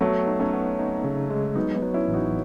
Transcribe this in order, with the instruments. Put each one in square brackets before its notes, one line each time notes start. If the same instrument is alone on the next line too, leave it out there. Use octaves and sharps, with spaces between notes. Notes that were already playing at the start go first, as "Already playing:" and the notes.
[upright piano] F#3 A3 [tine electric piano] B3
[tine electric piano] D#4
[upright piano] A3 C#4
[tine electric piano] B3
D#4
C#3
G#3
[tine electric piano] F#3 [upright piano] B3 D#4
[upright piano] B3 D#4
[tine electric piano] F#3
[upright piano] C#4 E4
[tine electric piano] A1
[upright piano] D#4 F#4